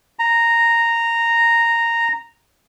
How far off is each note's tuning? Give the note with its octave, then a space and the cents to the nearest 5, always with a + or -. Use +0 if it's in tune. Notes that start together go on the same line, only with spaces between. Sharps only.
A#5 -10